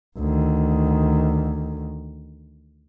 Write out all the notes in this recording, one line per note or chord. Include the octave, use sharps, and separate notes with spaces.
D2 D#3